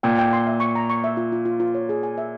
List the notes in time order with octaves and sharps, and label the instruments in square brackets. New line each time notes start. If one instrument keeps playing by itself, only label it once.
[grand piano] A#2 [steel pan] G5
[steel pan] G5
C6
E5
C#6
A#5
C#6
E5
F4
F4
F4
F4
C#5
G#4
G#5
E5